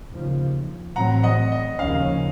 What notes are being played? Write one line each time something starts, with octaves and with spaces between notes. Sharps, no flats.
D#2 C#3 F3
A1 A2 F#3 C4 F#5 A#5
D#5 F#5
D#5
D#2 C#3 F3 A#3 C#4 F5